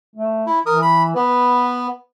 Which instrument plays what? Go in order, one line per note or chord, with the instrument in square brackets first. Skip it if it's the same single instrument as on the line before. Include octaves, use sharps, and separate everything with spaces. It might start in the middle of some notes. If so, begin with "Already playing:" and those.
[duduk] A3
[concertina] E4
[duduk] E3 [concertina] A#4 D#6
[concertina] B5
[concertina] B3 [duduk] B4